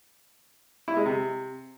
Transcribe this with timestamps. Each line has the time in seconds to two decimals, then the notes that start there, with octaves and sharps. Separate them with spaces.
0.88 E4
0.97 G#3
1.06 C3